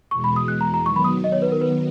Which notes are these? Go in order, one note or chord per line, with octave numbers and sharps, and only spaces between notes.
E2 B2 G#3 C#6
B5
D#6
F#6
A#5
A#5
D#3 F#3 B3 C#6
B5
D#6
D#5
C#5
B4
A#4
B4